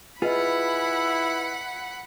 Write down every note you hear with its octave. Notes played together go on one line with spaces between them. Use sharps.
E4 F4 G#4 B4 D#5 F#5 B5